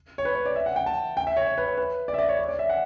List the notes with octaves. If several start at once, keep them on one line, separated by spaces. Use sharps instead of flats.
C#5
B4
C#5
D5
E5
F#5
G5
A5
G5
E5
C#5
C#5
B4
C#5
B4
D5
E5
D5
C#5
C#5
D5
E5
F#5